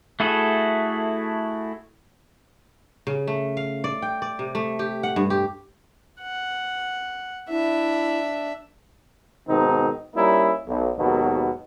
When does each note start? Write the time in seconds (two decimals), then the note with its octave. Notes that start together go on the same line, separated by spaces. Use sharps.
0.20 A3 E4 F#4 G#4 A4
3.07 C#3
3.27 A3
3.57 F5
3.84 D5
4.02 G5
4.22 D5
4.39 C3
4.55 A3
4.79 G4
5.03 F#5
5.16 G2
5.30 G4
6.21 F#5
7.49 D4 E4 E5
9.48 G#2 B2 D#3 C4 D#4
10.16 G3 A#3 C#4 D#4 E4
10.68 B1
10.97 G#1 D#2 B2 F#3 B3